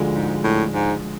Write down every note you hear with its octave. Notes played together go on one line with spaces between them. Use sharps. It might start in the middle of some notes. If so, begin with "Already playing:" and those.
Already playing: D2 D3 F3 G#3
G#2
A2
G#2